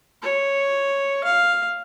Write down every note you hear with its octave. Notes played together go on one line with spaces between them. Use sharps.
C#5
F5